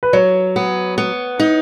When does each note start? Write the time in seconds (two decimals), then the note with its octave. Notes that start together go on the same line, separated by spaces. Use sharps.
0.03 B4
0.13 F#3 C#5
0.56 B3
0.98 B3
1.39 D#4